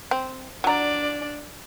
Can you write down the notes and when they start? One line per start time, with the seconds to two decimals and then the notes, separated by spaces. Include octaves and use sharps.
0.11 C4
0.64 F#3 D4 D5 A#5